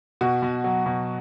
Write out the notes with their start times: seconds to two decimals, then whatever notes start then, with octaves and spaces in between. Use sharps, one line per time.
0.21 B2 F#4
0.42 B2
0.64 F#3
0.86 B2